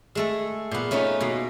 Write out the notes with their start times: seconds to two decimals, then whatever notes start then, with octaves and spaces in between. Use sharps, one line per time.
0.15 G#3 A3 A4
0.71 A#2 B3
0.91 A3 C#4 D#4 F4
1.20 B2 A#3